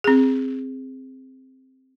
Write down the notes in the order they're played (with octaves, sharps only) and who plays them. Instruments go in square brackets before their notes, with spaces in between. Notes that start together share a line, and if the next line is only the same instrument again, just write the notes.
[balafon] C4 G#4